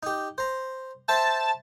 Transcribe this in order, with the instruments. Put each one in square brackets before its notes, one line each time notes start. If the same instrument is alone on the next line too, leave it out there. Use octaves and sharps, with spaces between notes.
[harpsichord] D#4 G4
C5 A#5
[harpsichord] C5 E5 G5 [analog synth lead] A5